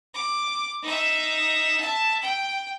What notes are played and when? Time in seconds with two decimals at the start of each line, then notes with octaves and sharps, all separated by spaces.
0.14 D6
0.83 D#4 E5
1.80 E5 A5
2.22 G5